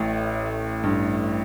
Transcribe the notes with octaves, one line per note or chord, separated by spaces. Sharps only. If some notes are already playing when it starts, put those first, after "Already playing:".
Already playing: A1 A2
G2